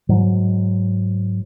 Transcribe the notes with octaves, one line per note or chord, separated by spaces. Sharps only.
G#2 F#3